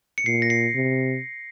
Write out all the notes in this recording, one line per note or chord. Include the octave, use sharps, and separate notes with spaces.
C#7
A#2 C7
A#6
C7
C3